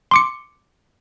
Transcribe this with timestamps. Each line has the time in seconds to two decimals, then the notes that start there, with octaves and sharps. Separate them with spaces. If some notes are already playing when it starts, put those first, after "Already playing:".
0.11 C6 D6 C#7